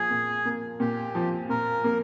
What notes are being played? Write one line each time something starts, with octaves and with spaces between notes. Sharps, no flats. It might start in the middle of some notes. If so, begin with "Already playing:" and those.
Already playing: A#2 F3 G#4
A#2
A#3
A#2 G4
F3
A#2 A#4
A#3